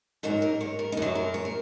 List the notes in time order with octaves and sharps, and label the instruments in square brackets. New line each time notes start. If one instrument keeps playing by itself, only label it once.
[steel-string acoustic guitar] G#2 F#3 A#4
A#4
C#5
A#4
D#4
F#2 F#3 F#4
A#4
C#5
A#4